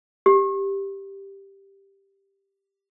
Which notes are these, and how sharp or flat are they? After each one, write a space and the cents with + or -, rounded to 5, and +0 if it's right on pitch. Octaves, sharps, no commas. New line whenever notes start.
G4 +5